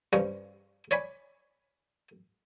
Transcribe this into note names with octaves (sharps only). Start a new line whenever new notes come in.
G2 F3 G3 C#4
C#5 D5 G#5 B5